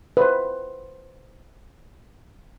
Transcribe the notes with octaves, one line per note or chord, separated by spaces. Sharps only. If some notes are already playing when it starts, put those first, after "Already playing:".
B4 C5